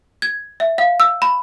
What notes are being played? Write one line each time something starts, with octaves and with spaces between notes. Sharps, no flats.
G#6
E5
F5
E6
B5